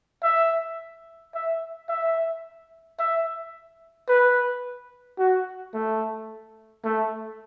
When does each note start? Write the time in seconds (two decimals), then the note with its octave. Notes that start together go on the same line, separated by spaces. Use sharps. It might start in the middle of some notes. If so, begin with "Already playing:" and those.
0.23 E5
1.34 E5
1.89 E5
2.99 E5
4.09 B4
5.19 F#4
5.74 A3
6.84 A3